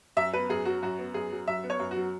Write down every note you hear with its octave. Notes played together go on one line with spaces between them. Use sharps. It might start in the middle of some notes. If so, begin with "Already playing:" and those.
F#2 E5
B3 B4
F#2 G#4
F#3 F#4
F#2 F#4
B3
F#2 G#4
F#3
F#2 E5
B3
C#5
F#2
F#4
F#3